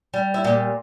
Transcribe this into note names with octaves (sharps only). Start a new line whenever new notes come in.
G3
E4
A#2 G4